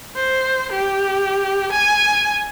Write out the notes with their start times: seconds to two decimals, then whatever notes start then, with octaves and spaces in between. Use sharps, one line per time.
0.15 C5
0.71 G4
1.71 G#5